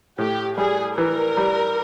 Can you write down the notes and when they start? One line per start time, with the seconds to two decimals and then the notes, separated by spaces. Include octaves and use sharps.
0.18 A2 G4
0.57 G3 G#4
0.97 E3 A#4
1.37 G3